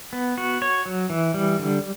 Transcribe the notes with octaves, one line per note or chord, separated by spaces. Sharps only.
B3
F#4
C#5
F#3
E3
G3
D3